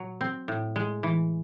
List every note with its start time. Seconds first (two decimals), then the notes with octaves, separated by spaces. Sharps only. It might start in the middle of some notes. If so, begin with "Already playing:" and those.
Already playing: A#2 F#3
0.21 C4
0.48 A2
0.76 G#3
1.03 E3